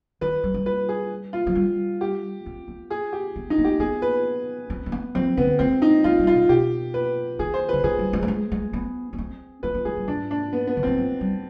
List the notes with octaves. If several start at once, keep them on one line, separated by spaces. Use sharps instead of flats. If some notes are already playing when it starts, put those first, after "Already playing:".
D#3 B4
G3
G3
B4
G#4
F4
F3
G3
G4
C4
B3
G#4
G4
B3
D#4
B3
G4
B3 G#4
B4
C4
C4
B3
F3 C4
D3 B3
G#3 C4
D#4
G#3 F4
G3
F4
B2
B2 G4
B4
D#3 G#4
C5
D3 B4
D#3 G#4
G3
G#3
G3
G#3
G#3
B3
B3
C4
C4 B4
B3
G#3 G#4
G3
G#2 D4
D4
B3
B3
D3
D#3 C4
F3
G3